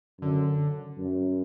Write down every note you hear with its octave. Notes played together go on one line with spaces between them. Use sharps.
F#2 D3
F#2